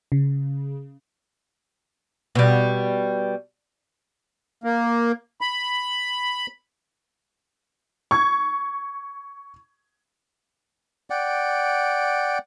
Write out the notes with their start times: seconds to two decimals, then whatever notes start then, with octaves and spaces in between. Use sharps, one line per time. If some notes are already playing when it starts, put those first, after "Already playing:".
0.12 C#3
2.35 B2 G3
4.64 A#3
5.41 B5
8.11 C#6 G#6
11.10 D5 F#5 G5